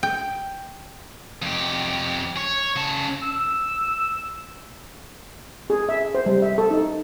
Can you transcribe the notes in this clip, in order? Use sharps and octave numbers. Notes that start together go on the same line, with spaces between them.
G5
F2 G4
C#5
C#3 A5
E6
G#4
E5
C5
G3
E5
A4
D#4